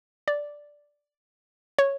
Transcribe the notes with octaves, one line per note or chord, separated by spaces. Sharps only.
D5
C#5